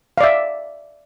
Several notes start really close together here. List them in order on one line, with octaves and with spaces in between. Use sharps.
F5 D5 E5